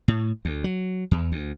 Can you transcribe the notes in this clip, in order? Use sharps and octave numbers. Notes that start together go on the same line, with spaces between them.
A2
D2
F#3
E2
D2